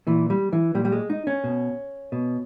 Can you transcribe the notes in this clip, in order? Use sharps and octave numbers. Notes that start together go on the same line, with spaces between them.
A#2 E3
G3
E3
A#2 G3
G3
G#3
D#4
C#4
B2
B2